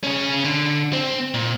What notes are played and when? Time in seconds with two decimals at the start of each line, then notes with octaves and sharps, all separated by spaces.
0.04 C#4 G#4
0.44 D3
0.93 C4
1.34 A#2